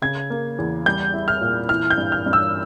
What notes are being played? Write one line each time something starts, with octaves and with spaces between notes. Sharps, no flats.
C#3 G#6
A#3
E2
G3 G6
E4
F6
A#2
E3 F6
G6
G2
F6
G2
E6